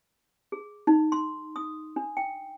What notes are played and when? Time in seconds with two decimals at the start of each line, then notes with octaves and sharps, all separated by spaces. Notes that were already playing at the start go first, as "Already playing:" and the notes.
0.52 G#4
0.87 D#4
1.12 C6
1.56 D#6
1.96 D4
2.17 G5